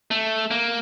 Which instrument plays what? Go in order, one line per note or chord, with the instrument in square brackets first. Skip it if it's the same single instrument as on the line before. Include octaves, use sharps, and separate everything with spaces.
[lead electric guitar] A3
A#3